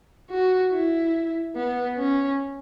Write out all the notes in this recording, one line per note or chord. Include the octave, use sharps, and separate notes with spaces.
F#4
E4
B3
C#4